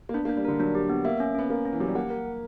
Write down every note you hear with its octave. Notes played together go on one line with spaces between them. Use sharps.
A#3
B3 D4
A#3
D4
G3
D3 A#4
F#3 D4
G4
B3
A#3 E5
C#4
B3 C#4
A#3 A#4
C#4
E3
F#3 G4
G3
A#3 F#5
A#4
A#4